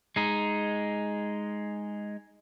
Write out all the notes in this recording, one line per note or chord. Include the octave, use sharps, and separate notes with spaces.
G#3 D#4